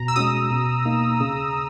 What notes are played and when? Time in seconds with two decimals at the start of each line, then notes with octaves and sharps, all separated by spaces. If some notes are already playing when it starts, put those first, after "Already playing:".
Already playing: B2 A#5
0.08 E6
0.16 G#3 C#4 F#4 D#6
0.51 B2
0.85 A#3 D#4
1.20 C#3